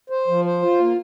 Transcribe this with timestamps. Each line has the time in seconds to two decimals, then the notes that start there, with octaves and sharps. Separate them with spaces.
0.10 C5
0.28 F3
0.45 C5
0.62 F4
0.80 A#3